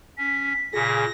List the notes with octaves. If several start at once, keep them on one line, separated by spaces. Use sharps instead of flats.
C#4 B6
A#2 C#3 G#4 A#6